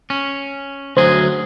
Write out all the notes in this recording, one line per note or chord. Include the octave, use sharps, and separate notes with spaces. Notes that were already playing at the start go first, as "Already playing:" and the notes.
C#4
D2 F#3 G#4 C5